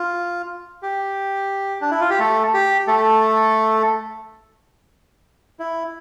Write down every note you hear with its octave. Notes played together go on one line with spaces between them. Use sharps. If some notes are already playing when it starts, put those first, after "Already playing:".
Already playing: F4
G4
D4
E4
F4
G4
A3 A4
G4
A3 A4
E4